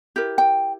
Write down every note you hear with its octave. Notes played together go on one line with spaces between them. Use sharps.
E4 G4 A#4
G5